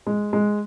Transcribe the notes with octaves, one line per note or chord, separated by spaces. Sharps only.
G#3
G#3